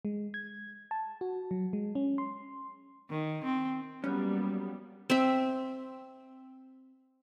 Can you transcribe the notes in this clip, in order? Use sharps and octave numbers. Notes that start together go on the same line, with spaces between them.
G#3
G#6
A5
F#4
F#3
G#3
C#4
C6
D#3
C4
F#3 G3 A#3 B3 C#4
C4 E5